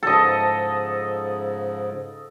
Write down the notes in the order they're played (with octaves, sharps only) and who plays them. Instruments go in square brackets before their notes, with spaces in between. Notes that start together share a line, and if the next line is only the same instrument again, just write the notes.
[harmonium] G#2 C#3 F3 [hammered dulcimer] A4 D#5